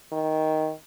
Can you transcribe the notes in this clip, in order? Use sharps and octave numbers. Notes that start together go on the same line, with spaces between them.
D#3